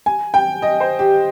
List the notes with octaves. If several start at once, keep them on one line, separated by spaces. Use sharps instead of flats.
G#5
G5
D#5
C5
G4